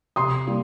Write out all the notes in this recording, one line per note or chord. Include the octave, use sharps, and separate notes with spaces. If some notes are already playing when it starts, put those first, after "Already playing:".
C3 C6 D#6
G3 A#3